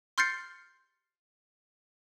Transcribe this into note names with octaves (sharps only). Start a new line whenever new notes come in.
C6 F6 G6 A6 C7 C#7